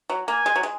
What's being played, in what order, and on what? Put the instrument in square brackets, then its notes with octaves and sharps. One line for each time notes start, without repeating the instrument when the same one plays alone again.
[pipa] F#3
[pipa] A#3 [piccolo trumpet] G#5
[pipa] G#3
F#3
G#3